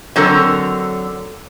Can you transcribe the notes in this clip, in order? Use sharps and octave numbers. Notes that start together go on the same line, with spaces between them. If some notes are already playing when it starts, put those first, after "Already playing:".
D3 F#3 C4 A4 A#4